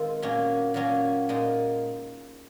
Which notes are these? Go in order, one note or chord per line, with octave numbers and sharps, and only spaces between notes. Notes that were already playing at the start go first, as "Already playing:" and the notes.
Already playing: D#3 G#3 C4 F4
A#2 F#3 A#3 C#4
A#2 F#3 A#3 C#4
A#2 G#3 D#4